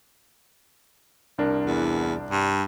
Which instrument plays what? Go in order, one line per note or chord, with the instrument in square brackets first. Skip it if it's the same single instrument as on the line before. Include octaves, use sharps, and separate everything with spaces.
[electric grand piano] C2 D4 A#4
[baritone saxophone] E2
G2